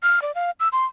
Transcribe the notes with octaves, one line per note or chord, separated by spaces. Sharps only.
F6
D5
F5
E6
C6